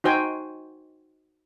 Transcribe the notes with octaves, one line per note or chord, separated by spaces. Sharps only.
D#4 F#4 C5 G5 G#5